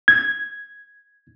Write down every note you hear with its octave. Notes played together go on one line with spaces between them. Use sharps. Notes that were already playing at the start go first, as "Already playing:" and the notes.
G#6